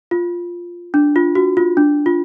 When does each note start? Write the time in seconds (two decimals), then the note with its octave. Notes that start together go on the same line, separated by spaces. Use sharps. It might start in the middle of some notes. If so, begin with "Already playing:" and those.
0.11 F4
0.94 D4
1.16 F4
1.35 F#4
1.57 F4
1.77 D4
2.06 F4